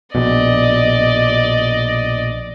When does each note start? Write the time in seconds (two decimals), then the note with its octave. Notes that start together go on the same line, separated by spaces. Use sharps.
0.15 A#1 B2 D5 D#5